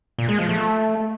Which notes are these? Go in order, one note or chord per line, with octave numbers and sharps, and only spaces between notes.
A#2
G#3
F3
A3